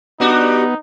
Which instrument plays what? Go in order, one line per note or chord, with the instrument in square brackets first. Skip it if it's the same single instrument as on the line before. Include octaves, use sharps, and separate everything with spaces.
[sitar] G3 D4 F#4 [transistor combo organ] B3 [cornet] D#4